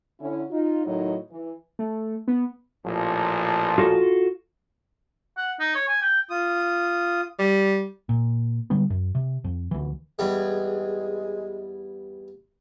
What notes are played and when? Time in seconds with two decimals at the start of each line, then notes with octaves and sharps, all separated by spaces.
0.19 D3 C#4 E4
0.50 D#4 F4
0.85 A2 D#3 F#3 D#4 C#5 D#5
1.30 E3
1.79 A3
2.28 B3
2.85 A1 A#2 F3
3.78 F4 F#4 A4
5.37 F#5
5.60 D#4
5.75 C#5
5.88 G#5
6.02 G5
6.30 F4 D#6
7.39 G3
8.09 A#2
8.70 D3 G3 G#3 B3
8.90 F#2
9.15 C3
9.44 F2
9.71 D2 E3
10.19 E2 G3 G#3